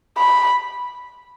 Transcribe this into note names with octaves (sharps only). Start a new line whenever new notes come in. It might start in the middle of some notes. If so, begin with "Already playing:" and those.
B5